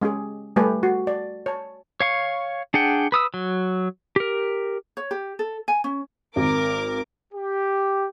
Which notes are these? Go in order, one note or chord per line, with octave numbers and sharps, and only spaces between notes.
G#3 C#4 G4 G#4
G3 A3 G4 B4 G#5
F#4
D5
C#5 A5
C#5 F5 C#6
D4 G#4 F#5 G5
B4 D#6 E6
F#3
G4 A#4
C#5
G4
A4
G#5
C#4
G#1 A#4 D6
G4